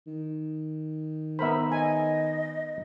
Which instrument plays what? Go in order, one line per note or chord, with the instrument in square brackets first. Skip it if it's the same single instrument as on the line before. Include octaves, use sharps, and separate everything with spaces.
[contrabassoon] D#3
[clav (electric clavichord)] B3 A#4 C5 [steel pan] E5 B5
[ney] D#5 [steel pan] G#5